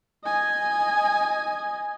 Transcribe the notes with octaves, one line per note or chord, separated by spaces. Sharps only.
D#5 G#5